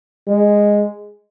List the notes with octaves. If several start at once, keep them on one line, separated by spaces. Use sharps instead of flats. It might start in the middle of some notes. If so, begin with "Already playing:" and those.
G#3